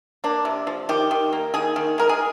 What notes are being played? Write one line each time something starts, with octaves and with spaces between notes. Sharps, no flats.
A#3 D4
C3
F3
D#3 G4
D#3
A#3
D#3 G#4
D#3
G#3 A#4
G#4